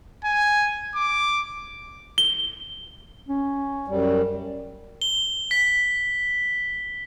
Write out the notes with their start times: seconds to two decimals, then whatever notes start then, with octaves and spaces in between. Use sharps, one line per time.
0.25 G#5
0.96 D6
2.18 G7
3.29 C#4
3.88 F#2 G3
5.02 G7
5.51 B6